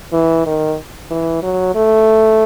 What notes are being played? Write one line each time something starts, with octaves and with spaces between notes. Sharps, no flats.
E3
D#3
E3
F#3
A3